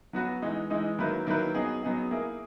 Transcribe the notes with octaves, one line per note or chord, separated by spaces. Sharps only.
F#3 B3 F#4 B4
E3 G#3 D#4
E3 G#3 D#4
D#3 F#3 A#3 E4 B4
D#3 F#3 A#3 E4 B4
F#3 B3 D#4 G#4
F#3 B3 D#4 G#4
A#3 E4 G#4